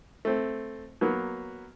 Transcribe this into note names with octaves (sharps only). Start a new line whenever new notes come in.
A3 C4
F#3 A#3 B3